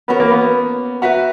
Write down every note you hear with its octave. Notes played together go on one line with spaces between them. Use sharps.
B3 C#4 F#4 A#4 C#5
A#3
B3
F#4 B4 E5 A#5